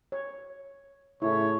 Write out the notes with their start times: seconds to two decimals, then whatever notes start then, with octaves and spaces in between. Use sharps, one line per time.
0.12 C#5
1.22 A2 C#3 E4 G#4 C#5